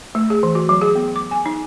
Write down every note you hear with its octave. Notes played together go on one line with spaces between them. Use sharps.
A3
G#4
E3
F#4
F#3
G#4
B3
D6
G#5
D#4